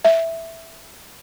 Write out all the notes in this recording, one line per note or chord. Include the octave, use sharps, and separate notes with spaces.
E5